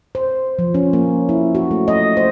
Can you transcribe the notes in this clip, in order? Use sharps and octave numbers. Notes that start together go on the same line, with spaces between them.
C5
F3
C#4
A#3
E4
F#4
A3
D#5
C5